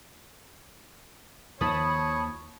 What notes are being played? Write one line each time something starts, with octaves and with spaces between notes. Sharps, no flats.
D#2 D#3 F3 C#5 A5 B5 D#6